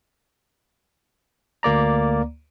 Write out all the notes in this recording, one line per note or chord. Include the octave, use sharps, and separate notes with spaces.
D2 A#3 D5 A#5